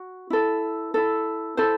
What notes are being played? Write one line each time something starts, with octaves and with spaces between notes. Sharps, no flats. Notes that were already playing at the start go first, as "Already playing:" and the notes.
Already playing: F#4
E4 A4
E4 A4
E4 A4 C5